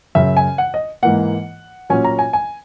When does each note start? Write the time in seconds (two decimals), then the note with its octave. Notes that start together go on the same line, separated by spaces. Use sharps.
0.15 F#2 C#3 F#3 E5
0.37 G#5
0.58 F#5
0.74 D#5
1.03 G#2 E3 A#3 F#5
1.90 A#2 F#3 C#4 G#5
2.04 A#5
2.19 G#5
2.33 G#5